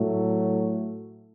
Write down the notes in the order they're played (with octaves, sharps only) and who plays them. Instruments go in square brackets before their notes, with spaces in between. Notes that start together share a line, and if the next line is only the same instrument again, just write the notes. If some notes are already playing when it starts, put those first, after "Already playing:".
Already playing: [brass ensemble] A2 F#3 A3